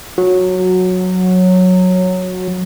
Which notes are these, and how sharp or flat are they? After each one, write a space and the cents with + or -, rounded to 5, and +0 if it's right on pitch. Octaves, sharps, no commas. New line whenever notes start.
F#3 -10